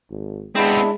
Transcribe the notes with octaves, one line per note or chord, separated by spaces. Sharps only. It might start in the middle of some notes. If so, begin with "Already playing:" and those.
G#1
G#3 B3 C4 D4 E4